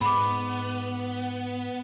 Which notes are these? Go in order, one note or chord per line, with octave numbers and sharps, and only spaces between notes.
G#2 B3 B5 D6